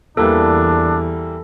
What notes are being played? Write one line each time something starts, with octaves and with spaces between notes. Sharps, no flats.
E2 E3 G3 A#3 D4 A4